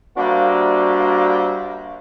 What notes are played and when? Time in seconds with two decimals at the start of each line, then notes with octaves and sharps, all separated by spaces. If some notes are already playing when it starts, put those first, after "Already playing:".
0.18 G3 A#3 D4 F#4 C5 E5